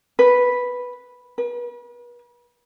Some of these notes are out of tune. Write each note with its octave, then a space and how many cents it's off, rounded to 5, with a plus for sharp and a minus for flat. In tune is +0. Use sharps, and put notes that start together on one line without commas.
B4 -5
B4 -40